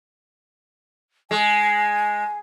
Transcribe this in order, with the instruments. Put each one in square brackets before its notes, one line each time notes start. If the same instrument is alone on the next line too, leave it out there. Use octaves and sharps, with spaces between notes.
[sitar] G#3 [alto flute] G#5